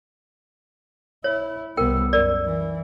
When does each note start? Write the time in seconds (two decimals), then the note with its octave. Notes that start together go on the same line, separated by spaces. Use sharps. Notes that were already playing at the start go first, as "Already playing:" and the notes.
1.24 E4 C#5
1.77 C2 B3 A#4 G5
2.13 F#2 A#4 D5
2.45 E3